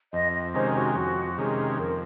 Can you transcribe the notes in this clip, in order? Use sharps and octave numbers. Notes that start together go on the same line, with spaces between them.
F2 D#5
D#5
C3 D#3 G#3 C#4 C5
F#4
F2 F#4
C3 D#3 G#3 C#4 G#4
F2 A#4